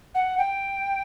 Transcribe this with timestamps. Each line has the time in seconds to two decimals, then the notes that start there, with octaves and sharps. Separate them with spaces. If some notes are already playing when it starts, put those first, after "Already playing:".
0.15 F#5
0.38 G5